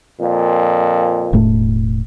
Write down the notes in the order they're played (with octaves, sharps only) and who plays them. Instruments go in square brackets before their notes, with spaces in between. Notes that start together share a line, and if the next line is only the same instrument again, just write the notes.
[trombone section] F2 A#2
[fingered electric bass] E1 A2 A3